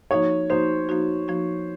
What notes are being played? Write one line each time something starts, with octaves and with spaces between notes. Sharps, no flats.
F3 A#3 D#4 F#4 C#5
F3 A#3 D#4 F#4 C5
F3 A#3 D#4 F#4
F3 A#3 D#4 F#4